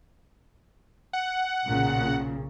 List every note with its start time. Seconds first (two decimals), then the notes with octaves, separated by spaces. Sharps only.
1.13 F#5
1.65 B1 A#2 C#3